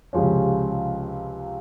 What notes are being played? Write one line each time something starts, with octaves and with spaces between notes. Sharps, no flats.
C#2 C3 F3 G#3 C#4